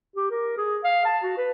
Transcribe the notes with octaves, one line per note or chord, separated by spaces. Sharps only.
G4
A#4
G#4
F5
A5
F#4
B4